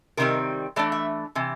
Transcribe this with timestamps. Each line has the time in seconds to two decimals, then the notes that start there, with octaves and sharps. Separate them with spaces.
0.17 C3 D#3 G3 C4 A#4
0.76 E3 A3 D4 D5
0.92 E5
1.35 C3 E3